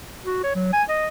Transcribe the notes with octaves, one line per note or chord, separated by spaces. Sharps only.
F#4
C#5
F#3
G#5
D#5